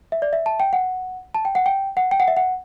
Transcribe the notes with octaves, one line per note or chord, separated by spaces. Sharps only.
E5
D5
E5
A5
G5
F#5
A5
G5
F#5
G5
F#5
G5
F#5
E5
F#5